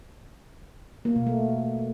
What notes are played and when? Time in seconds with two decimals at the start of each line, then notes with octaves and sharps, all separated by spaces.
1.05 A#3
1.16 B2
1.27 A3